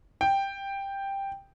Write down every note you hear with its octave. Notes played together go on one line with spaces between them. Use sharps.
G5